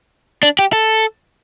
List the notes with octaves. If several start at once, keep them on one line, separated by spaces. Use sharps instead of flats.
D4
G4
A4